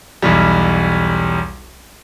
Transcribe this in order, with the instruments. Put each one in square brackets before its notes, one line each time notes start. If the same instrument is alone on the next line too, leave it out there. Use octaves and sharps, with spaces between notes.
[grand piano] B1 E2 G3